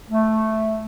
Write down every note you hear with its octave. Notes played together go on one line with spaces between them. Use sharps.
A3